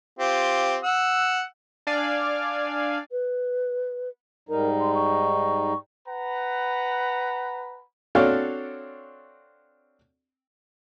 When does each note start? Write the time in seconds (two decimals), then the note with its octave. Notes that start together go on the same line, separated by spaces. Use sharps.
0.19 C4 F4 G4
0.84 F#5 E6
1.87 D4 D5 F5 G#5
3.11 B4
4.49 G#2 G3 D#4 A#4
4.81 C6
4.95 C#6
6.08 B4 F#5 A#5 B5
8.15 C4 D4 F#4 A4 C#5 F5